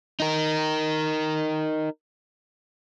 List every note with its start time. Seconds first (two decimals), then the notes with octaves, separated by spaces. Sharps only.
0.20 D#4 A#4